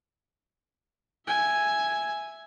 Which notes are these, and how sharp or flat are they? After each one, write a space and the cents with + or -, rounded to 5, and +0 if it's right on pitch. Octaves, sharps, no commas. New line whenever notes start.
E5 +0 G#5 +0